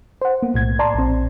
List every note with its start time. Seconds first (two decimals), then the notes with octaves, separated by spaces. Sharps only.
0.21 C5 F#5
0.42 A#3 B3
0.54 B1 A2 G#6
0.79 D5 A5 A#5 C6
0.94 A#1 C4